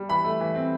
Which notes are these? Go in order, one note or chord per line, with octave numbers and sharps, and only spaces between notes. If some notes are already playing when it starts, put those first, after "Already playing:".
Already playing: G3
E3 B5
A3
E3
C4